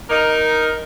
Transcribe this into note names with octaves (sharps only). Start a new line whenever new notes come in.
D#4 A#4